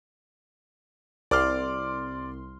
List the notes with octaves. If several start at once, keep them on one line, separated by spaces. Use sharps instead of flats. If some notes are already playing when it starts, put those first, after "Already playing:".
C2 D5 C6 D6 F6